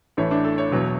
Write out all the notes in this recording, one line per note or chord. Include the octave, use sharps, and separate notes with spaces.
A1 A2 E3 A3 C#5
D4
A4
C#5
E1 E2 B2 F#3